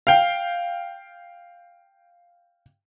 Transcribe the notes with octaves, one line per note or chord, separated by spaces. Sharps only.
F5 G5